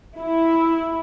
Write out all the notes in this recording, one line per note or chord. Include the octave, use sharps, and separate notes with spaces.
E4